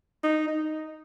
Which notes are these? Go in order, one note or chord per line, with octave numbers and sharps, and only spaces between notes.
D#4
D#4